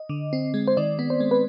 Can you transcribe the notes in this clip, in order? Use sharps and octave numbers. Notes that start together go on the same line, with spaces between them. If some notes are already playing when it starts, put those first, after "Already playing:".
Already playing: D#5
D3
C4
G#3
C5
D#3 D5
B3
C5
G#3
B4